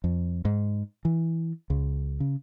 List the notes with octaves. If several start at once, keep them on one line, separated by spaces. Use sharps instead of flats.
F2
G#2
E3
C#2
C#3